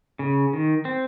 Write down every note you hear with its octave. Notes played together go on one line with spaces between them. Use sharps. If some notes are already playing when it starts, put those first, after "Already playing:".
C#3
D#3
C4